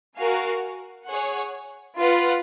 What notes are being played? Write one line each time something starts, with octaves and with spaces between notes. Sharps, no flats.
F#4 A#4 F5 G#5
G#4 C#5 F#5
F4 B4 F#5